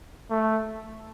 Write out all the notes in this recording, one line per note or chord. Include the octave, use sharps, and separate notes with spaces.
A3